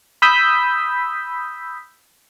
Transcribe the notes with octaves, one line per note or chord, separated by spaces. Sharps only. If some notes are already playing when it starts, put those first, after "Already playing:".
B5 D#6 E6 G6 B6